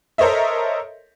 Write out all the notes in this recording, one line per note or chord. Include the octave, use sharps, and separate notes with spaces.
A4 A#4 C5 C#5 D#5 E5